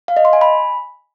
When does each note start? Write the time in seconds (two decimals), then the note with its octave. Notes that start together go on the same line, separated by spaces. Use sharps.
0.08 F5
0.17 D#5
0.25 C6
0.33 G#5
0.41 B5